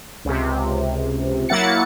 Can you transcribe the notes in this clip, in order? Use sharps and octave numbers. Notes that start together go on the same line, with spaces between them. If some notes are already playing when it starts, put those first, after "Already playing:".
C#2 C3
F#3 A#3 E4 F#5 A6 C#7